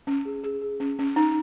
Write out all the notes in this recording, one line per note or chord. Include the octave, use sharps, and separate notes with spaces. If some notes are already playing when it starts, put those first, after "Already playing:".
C#4
G#4
G#4
G#4
C#4
C#4
D#4